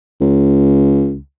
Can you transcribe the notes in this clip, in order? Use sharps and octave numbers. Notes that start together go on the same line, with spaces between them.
C#2